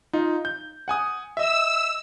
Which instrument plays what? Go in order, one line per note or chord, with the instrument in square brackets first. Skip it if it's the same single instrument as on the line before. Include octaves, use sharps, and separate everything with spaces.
[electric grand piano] D#4 F4
G6
F#5 G#5 D#6
[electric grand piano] D#5 E5 [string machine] E6